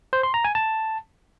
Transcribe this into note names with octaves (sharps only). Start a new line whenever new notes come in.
C5
C6
A#5
G#5
A5